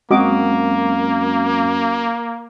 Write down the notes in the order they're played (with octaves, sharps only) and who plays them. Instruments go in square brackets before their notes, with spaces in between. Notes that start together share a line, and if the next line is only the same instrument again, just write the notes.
[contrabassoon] F#2 [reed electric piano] G#3 C4 [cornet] A#3 [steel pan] F#4 D#5 D6